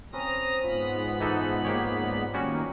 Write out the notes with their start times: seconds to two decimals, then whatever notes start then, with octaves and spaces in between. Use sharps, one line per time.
0.13 C4 C#4 B4 A#5 D#6 A#6
0.63 G#2 B3 F4 B5
1.20 E3 D#4 A4
1.65 A#3 G4 C#5
2.03 D5 A#5
2.34 D#3 G3 A#3 C#4 F#4